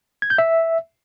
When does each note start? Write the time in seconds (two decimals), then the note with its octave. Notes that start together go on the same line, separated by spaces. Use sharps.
0.22 G#6
0.30 G6
0.38 E5